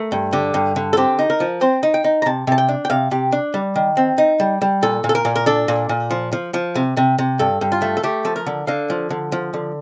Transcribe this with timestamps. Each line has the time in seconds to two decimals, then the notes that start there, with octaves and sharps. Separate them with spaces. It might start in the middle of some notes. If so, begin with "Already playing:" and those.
Already playing: A3 A#4
0.12 G2
0.33 D3 G4
0.54 G2
0.76 D3
0.93 A4
0.97 C4 G4
1.19 D#4
1.30 A#4
1.40 F3
1.61 C4 C5
1.83 D#4
1.94 G5
2.04 D#4
2.22 A#5
2.26 C3 A5
2.47 C3 A5
2.58 G5
2.69 D4
2.85 G5
2.90 C3 F5
3.11 C3 G4
3.32 D4
3.54 G3
3.76 D#3
3.97 C4
4.18 D#4
4.40 G3
4.62 G3
4.83 A#2 A4
5.04 A#2
5.09 A4
5.15 A#4
5.25 A#2
5.36 A#4
5.46 D4 A4
5.68 A#2
5.89 A#2
6.11 F3
6.33 F3
6.54 F3
6.75 C3
6.97 C3
7.18 C3
7.39 G2 A4
7.61 G2
7.72 F4
7.82 A3
7.97 A4
8.03 A3 G4
8.25 F3 A4
8.36 A#4
8.46 D3
8.67 D3 F5
8.90 F3
9.10 D3
9.32 F3
9.54 D3